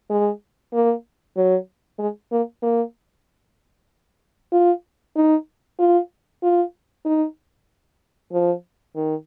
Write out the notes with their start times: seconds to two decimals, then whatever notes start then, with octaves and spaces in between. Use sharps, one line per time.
0.10 G#3
0.73 A#3
1.37 F#3
1.99 G#3
2.32 A#3
2.63 A#3
4.52 F4
5.16 D#4
5.79 F4
6.43 F4
7.05 D#4
8.33 F3
8.96 D#3